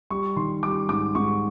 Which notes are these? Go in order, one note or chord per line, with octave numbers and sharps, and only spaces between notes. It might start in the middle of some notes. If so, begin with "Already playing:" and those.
G3 C#6
D#3 C6
G3 D6
G#2 D6
G#2 C#6